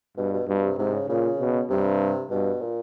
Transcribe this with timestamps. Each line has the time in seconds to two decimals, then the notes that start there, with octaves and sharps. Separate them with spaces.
0.17 G2 B2
0.33 B2
0.48 G2 B2
0.63 C3
0.79 G#2 C3
0.94 C#3
1.09 A#2 C#3
1.39 B2
1.70 G2 C3
2.31 G2 B2
2.61 A#2